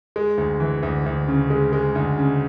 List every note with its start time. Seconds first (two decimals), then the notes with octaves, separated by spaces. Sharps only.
0.16 G#3
0.38 D2
0.60 E3
0.83 D2
1.06 D2
1.28 C#3
1.50 G#3
1.73 G#3
1.95 D2
2.18 C#3